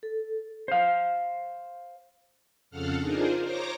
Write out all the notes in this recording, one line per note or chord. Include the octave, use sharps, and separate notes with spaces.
A4
C5 F5
F2 C#3 A4 F5 F#5 F6
D4 D#4 F4 G#4 A#4 C5
C5 C#5 A#5 D6 A#6